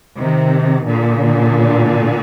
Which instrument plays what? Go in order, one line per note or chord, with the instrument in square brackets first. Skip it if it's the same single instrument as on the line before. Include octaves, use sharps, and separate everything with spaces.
[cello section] C3 D#3
A#2 D3